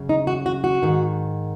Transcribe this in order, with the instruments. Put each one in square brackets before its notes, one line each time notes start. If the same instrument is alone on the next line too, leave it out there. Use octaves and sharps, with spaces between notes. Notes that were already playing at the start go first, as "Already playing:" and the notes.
Already playing: [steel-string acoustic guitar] F#2 C#3
D#4
F#4
F#4
F#4
G#2 D#3